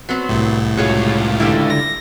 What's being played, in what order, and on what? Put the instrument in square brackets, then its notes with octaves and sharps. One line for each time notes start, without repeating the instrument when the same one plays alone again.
[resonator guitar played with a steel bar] F#3 B3 C4
[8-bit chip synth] C2 A2
[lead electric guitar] C#2 F4 [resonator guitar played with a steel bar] F#4 G#4 C#5
[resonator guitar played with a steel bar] D3 G3 E4
[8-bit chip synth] A#6